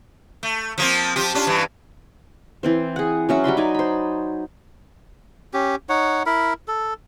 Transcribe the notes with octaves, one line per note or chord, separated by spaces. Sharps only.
A3
F3 A#3 C4
F3 F4 G4
C#4 D4 F4
G2 E3
E3 C4 C5
G#4 F#5
F#3 C#4 E5 F#5
F#3 G3 B5 C6
D#4 D5 G#5
C5 B5
C#4 G4
D#4 C#5 F#5
E4 A#4 B5
A4